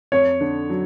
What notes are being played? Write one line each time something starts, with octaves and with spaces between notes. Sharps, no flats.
F2 C#5
D3
F#3